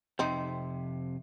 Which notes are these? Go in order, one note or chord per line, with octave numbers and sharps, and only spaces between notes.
F2 C3 C4 D#4